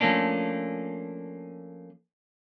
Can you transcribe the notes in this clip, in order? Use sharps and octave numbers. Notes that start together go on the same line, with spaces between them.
F3 A3 A#3 C#4 D4